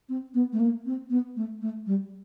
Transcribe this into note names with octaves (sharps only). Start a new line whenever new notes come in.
C4
B3
A3
A#3
C4
B3
A3
A3
G3